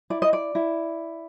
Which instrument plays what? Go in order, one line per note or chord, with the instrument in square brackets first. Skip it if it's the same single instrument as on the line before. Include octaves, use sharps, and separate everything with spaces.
[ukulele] E4 D5
D#5
D5
E4